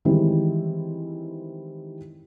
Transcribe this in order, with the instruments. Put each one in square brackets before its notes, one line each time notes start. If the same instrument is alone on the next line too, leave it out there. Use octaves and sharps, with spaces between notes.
[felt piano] D#3 E3 G3 G#3 C4 E4